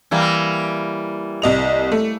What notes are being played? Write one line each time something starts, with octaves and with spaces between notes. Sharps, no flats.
E3 G3 A#3
C2 D#5 F7
A3